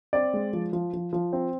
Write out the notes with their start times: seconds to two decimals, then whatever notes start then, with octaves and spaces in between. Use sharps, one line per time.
0.13 C4 D5
0.34 G#3
0.53 F3
0.73 F3
0.93 F3
1.13 F3
1.33 C4